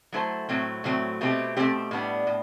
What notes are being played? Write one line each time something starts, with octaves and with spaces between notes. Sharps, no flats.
F#3 A3 E4 A4 C5
A2 F#3 A3 C4
A2 F#3 A3 C4
B2 A3 C4 G4
B2 A3 C4 G4
A2 G3 B3 D4
A2